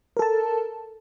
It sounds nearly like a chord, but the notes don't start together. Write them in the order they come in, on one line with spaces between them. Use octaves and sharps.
A#4 A4 A5